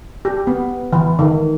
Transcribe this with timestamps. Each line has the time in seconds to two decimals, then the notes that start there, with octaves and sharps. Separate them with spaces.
0.25 G4
0.47 B3
0.93 E3
1.19 D#3